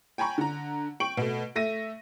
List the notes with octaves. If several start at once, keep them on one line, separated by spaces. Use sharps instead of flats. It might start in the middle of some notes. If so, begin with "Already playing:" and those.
G5 G#5 A#5 B5 C#6
D3 A#5
G5 C#6 D7 F#7
B2 A3
A3 E5 A#6 D#7